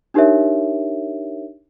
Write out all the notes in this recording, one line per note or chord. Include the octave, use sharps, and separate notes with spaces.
D4 D#4 G4 A#4 C#5 E5